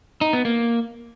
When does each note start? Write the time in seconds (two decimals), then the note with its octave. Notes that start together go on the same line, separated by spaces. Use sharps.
0.21 D#4
0.33 B3
0.45 A#3